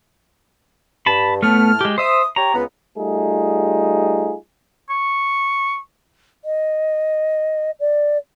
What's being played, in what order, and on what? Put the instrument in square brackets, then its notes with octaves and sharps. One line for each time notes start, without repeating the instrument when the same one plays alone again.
[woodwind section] G2 [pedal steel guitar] A5 B5
[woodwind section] A2 A5 F6 [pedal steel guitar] A3 B3
[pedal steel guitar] G#3 G4
[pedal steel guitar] C5 E5 [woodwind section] D#6
[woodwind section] G4 C#5 [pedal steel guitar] A#5
[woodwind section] C#2 B3
[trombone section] G3 A3 D#4 F4 G#4
[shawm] C#6
[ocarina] D#5
D5